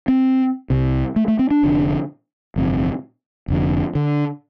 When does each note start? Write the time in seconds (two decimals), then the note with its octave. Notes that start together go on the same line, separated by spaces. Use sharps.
0.08 C4
0.70 C2 C3
1.16 A3
1.28 A3
1.39 C4
1.51 D4
1.63 F1 F2 D3
2.56 G1 F2 C3
3.48 F1 F2 D3
3.95 D3